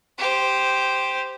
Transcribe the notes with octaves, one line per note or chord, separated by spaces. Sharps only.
G4 C5